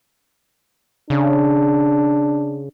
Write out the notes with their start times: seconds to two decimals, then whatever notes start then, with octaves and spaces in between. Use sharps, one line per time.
1.10 C#3 D4